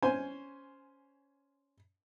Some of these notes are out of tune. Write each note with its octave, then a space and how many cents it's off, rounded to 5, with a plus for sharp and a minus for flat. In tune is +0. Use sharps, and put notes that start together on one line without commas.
C#4 +10 C5 +0 G#5 +0